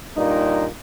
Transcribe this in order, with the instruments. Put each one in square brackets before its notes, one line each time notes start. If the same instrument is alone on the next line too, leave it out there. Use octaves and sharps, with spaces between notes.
[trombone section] G2 A#2 D#4